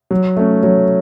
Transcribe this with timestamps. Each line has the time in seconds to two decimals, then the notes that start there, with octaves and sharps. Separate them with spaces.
0.11 F#3
0.37 A3 C#4
0.63 F#3